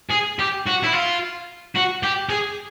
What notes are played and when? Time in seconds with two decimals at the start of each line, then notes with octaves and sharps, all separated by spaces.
0.11 G#4
0.39 G4
0.66 F#4
0.83 E4
0.93 F4
1.75 F#4
2.03 G4
2.30 G#4